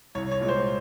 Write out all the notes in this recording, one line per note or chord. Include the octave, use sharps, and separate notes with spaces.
C2 C#5
C#5
A#2 G#3
C5